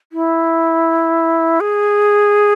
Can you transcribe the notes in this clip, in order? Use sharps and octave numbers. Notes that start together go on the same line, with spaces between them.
E4
G#4